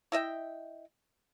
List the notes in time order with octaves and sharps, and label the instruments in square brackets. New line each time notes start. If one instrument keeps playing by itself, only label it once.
[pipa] E4 D#5 E5 G5